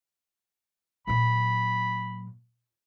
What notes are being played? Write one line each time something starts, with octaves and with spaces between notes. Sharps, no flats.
A#2 F#3 B5